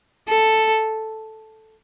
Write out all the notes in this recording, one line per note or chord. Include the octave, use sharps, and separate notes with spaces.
A4